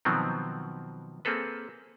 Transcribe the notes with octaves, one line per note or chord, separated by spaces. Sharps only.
B2 D#3 F3 F#3 B3 C4
A#3 C4 G#4 A4 B4